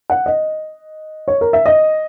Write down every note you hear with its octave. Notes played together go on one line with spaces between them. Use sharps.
F#5
D#5
C#5
A#4
E5
D#5